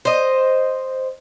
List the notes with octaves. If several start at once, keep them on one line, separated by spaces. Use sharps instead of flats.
C5 D#5